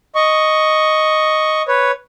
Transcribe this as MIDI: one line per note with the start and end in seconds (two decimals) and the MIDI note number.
0.15 1.62 75
0.15 1.62 85
1.68 1.91 71
1.68 1.91 73